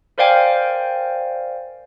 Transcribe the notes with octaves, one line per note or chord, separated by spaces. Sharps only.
A#4 C5 D5 F5 G5 G#5